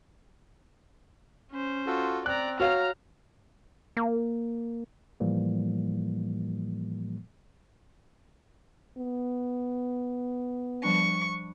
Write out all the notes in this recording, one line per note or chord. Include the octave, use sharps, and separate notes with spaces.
C#4 C5
F4 F#4 A4
C4 D5 A#5 F#6
F#4 C#5 F5 A#5 F6
A#3
A2 E3 F3 G3 A#3
B3
F3 G3 D4 C#6